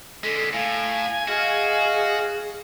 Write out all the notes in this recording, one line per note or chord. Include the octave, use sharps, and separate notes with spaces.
D3 G#3 A4 B6
A2 F5 G#5
F#4 G#4 D#5 F5